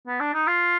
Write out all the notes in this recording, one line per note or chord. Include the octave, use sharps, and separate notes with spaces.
B3
D4
D#4
F4